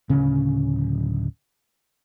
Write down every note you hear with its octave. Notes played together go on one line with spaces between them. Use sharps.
D1 C#3 C#4